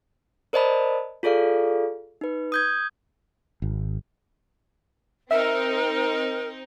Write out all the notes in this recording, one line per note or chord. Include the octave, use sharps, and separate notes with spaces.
A#4 C5 D5 D#5 A5 B5
F4 G#4 A4 D5 F5
D#4 B4
D#6 G6 G#6
G#1
C4 D#4 A#4 E5 E6